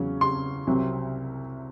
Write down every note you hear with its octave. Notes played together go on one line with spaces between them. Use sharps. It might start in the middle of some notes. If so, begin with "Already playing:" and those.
Already playing: E2 C#3 F#3 C#4
C6
C2 C3 F#3